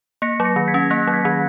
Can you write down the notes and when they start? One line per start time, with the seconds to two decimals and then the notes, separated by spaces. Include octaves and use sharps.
0.22 A#3 A#6 C#7
0.40 F#3
0.45 A#6 C#7
0.56 D#3
0.68 G#6 B6
0.74 C#4
0.90 A#3 F#6 A#6
1.07 F#3
1.14 G#6 B6
1.25 D#3